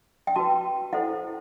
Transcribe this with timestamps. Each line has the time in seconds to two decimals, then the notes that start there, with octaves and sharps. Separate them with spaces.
0.27 G5
0.36 F#4 B4 A5
0.93 E4 A4 C5 F#5